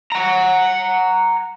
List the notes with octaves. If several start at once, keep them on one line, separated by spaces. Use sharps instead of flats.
F#5 A#5